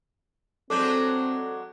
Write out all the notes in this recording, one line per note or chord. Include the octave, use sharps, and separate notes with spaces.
F#3 G#3 C4 D4 A4 D6 G6